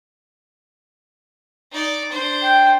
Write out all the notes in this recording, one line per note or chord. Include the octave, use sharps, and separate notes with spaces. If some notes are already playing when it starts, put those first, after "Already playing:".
D#4 D5
D4 C5
G5